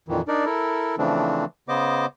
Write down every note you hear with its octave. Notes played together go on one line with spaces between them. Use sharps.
F2 A#2 D#3 E3
D4 D#4 A#4 D5
E4 A4 A#4
C#3 E3 F3 A3 C4 D4
C#3 B3 C5 D#5 D6